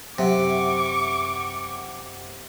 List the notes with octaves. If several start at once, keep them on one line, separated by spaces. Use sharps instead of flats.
F#2 C3 E5 F#5 C#6 D6